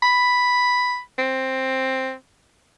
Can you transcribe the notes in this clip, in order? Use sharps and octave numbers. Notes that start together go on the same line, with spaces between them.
B5
C4